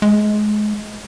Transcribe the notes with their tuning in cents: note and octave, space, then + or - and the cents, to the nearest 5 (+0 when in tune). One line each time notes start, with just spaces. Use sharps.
G#3 +25